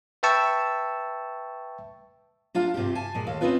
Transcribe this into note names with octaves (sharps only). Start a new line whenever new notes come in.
B4 E5 G5 A5 C#6 E6
D4 F4 F5 A#5
G2 C3 F4 G4
G#5 A5
A#2 G#3
D#2 A4 F5
C4 C#4 D#4 F4 B4